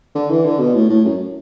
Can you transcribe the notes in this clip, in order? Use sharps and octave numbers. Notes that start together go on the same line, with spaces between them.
D3
E3
D3
B2
A2
A2
F#2